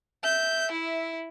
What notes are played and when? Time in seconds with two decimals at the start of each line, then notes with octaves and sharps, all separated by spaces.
0.24 E5 G6
0.71 E4